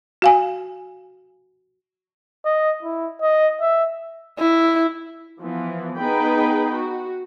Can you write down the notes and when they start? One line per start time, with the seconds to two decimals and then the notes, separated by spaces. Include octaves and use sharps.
0.22 F#4 F5 G#5
2.45 D#5
2.83 E4
3.22 D#5
3.61 E5
4.39 E4
5.41 E3 F3 B3
5.97 B3 D#4 G#4 B4 G5 B5
6.73 F#4